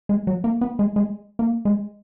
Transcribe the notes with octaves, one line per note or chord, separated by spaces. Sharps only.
G#3
F#3
A#3
B3
G#3
G#3
A#3
G#3